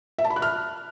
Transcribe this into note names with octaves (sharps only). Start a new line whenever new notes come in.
E5
A5
B5
F#6
F6